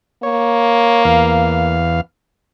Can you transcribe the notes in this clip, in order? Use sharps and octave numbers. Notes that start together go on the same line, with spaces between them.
A#3 C#5
E2 F5